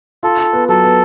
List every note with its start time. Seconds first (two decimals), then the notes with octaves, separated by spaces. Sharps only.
0.23 F4 A4
0.39 F4
0.53 B3
0.69 F#3 A4
0.84 B3